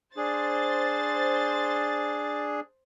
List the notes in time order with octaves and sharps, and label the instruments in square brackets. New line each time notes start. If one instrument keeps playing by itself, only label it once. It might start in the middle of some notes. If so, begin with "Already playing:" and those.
[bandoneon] D4 G#4 [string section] C5 A6